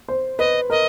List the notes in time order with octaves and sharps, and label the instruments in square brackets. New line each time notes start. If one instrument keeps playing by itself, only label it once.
[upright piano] C5
[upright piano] B4 [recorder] D#5
[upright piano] A#4 [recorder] D#5